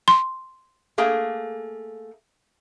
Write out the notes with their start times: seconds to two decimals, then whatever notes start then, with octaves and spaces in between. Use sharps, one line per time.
0.08 C6
0.98 A3 A#3 G#4